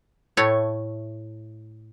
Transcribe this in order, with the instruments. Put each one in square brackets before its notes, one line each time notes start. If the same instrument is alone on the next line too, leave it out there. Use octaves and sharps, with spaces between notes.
[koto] A2 A3 C#5